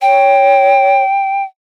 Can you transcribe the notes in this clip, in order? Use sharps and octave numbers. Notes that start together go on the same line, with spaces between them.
C#5 G5